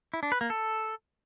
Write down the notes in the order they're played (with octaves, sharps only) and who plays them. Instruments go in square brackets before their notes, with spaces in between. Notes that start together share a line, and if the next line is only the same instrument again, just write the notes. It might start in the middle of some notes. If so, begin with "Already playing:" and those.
[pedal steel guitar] E4
D4
B4
A#3
A4